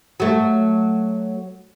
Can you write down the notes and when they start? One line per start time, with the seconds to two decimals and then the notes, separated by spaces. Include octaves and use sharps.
0.20 F#3 A3